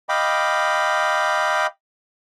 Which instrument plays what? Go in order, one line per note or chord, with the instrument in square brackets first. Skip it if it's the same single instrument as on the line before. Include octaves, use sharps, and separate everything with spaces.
[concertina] D#5 F5 G5 B5 D6